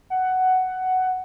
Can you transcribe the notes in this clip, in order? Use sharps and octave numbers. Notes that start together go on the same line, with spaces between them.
F#5